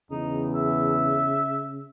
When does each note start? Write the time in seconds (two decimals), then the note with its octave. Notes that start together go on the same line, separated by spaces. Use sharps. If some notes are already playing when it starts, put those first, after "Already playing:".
0.11 E2 C#3 D#4
0.55 E5